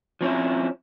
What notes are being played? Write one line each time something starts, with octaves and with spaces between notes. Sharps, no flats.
F3 C4 C#4 E4